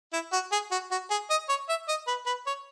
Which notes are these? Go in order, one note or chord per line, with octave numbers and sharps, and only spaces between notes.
E4
F#4
G#4
F#4
F#4
G#4
D#5
C#5
E5
D#5
B4
B4
C#5